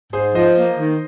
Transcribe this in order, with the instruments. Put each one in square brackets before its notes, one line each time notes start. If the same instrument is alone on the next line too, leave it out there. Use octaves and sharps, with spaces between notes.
[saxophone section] G#2 [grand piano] G#4 C5
[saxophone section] F3 [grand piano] C5 D#5
[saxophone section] A#3
D#3